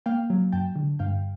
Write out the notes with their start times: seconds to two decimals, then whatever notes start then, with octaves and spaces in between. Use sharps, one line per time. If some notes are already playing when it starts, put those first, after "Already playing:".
0.06 A#3 F5 G5
0.30 F#3
0.52 F#2 G5 A5
0.76 D3
0.99 G2 F5 G5